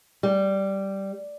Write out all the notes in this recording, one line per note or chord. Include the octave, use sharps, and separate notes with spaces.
G3